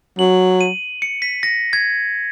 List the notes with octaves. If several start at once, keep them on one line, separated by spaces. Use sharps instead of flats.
F#3 F#7
D#7
C#7
B6
A#6
G#6